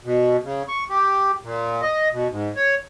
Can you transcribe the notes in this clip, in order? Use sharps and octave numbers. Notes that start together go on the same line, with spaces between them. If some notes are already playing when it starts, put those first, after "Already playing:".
B2
C#3
C#6
G4
A#2
D#5
B2
G#2
C#5